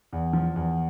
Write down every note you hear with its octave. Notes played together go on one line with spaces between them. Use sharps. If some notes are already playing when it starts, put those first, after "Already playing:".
E2
F3
E2